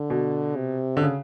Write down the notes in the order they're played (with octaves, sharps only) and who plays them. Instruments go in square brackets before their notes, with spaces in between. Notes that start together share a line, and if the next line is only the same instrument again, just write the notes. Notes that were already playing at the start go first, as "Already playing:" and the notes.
Already playing: [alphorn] D3
[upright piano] B2
[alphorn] C3
[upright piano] D3
C#3